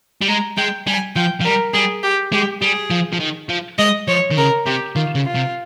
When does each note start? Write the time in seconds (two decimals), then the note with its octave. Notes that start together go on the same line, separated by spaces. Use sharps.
0.21 G3
0.28 G#3 A#5
0.57 G#3 G5
0.87 G3 G#5
1.16 F3 G5
1.41 F3
1.44 G3 A#4
1.74 G3 G#4
2.03 G4
2.33 G#3 G4
2.62 G3 G#4
2.90 F3
3.13 F3
3.20 D#3
3.49 F3
3.78 G#3 D#5
4.08 F3 C#5
4.31 D#3
4.37 C#3 A#4
4.66 C3 G4
4.96 D#3 F4
5.15 C#3
5.25 F4
5.35 C3